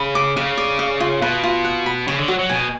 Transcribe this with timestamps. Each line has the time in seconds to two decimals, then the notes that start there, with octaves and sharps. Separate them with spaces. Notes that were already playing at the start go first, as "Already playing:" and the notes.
Already playing: C#3 B5
0.15 D6
0.36 C#3 F5
0.58 D5
0.79 F5
1.00 F4
1.22 B2 B4
1.44 F4
1.64 F#5
1.86 B5
2.07 C#3 C#5
2.18 D3
2.28 F#3 F#4
2.39 F#3
2.49 B2 G#5